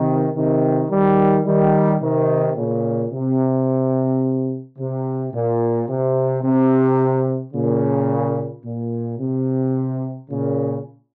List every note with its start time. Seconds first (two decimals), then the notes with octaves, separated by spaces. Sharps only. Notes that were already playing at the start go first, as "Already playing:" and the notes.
Already playing: C3 D#3
0.35 C3 D#3
0.90 D#3 G3
1.45 D#3 G3
2.00 C3 D#3
2.56 A#2 C#3
3.12 C3
4.78 C3
5.33 A#2
5.88 C3
6.43 C3
7.53 A#2 C#3
8.64 A#2
9.19 C3
10.29 A#2 C#3